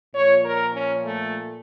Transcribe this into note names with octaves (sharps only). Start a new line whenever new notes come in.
A#2 F3 C#5
A#4
C#4
A3